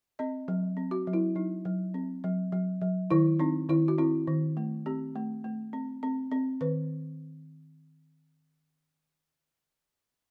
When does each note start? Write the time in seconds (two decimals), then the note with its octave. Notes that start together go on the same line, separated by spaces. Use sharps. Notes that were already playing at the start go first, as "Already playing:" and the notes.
0.19 C4 D#5
0.48 F#3
0.77 C4
0.91 F#4
1.07 F#3
1.13 E4
1.35 F#3 D#4
1.65 F#3
1.94 C4
2.24 F#3
2.52 F#3
2.81 F#3
3.10 D#3 E4
3.39 C4 D#4
3.69 D#3 E4
3.88 F#4
3.98 C4 E4
4.27 D#3
4.57 A3
4.86 C4 G4
5.16 A3
5.44 A3
5.73 C4
6.03 C4
6.31 C4
6.61 D#3 B4